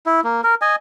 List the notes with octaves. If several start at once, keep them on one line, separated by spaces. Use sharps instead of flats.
E4
A#3
A#4
D#5 G#5